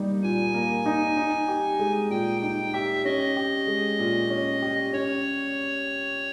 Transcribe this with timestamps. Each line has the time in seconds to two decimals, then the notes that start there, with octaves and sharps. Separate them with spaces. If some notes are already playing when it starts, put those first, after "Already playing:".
Already playing: G3 A#3 D#4
0.23 A#2 G#5
0.54 A#3
0.86 D#4
1.17 D#4
1.48 G4
1.80 G#3
2.11 A#2 G5
2.42 D#4 G5
2.74 G4 E5
3.05 C#4 D#5
3.36 G4
3.67 G#3
3.99 A#2
4.30 C#4
4.62 G4
4.92 C#4 C#5